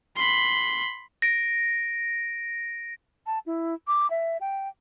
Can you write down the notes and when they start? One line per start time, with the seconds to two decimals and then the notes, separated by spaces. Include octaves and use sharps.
0.16 B5 C6
1.22 A#6 D7
3.26 A5
3.46 E4
3.87 D6
4.10 E5
4.41 G5